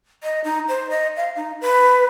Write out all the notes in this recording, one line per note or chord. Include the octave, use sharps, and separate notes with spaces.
D#5
D#4
C5
D#5
F5
D#4
B4